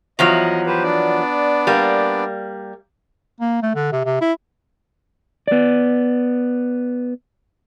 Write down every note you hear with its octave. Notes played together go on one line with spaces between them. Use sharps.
E2 F3 F#3 D#5
G4 B4 C5
B3 D4 D5
G3 A#3
A#3
A3
D3
C3
C3
E4
B3 D5